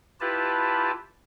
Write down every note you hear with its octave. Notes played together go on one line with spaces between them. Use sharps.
E4 F4 G4 B4 A5